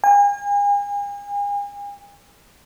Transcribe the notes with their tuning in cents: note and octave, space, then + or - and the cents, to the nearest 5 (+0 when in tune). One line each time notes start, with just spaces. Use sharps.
G#5 -40